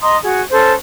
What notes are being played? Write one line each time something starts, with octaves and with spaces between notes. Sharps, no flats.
D#5 A#5 C6 D#6
F#4 G#4
C#4 A4 C5